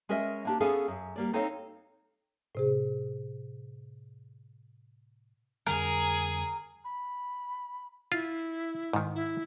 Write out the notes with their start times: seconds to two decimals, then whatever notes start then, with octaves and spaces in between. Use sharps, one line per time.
0.09 G#3 C#4 A#4 D#5 E5
0.45 A#3 D4 G4
0.60 B3 C#4 G#4 A4 D5 F5
0.88 F#2
1.16 G3 A#3 D5
1.33 C4 D#4 A4 C#5 F5
2.55 A2 C3 G#4
5.67 F2 D3 G3 G#4 A#4
6.85 B5
8.12 E4 F4
8.93 G#2 D#3
9.15 E4